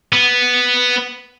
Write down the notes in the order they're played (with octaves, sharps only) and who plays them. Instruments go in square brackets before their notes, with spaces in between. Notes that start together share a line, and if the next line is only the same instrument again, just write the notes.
[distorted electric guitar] B3